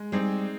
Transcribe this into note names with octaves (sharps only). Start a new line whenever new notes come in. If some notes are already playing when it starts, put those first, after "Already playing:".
Already playing: G#3
G3 C4 D#4 G#4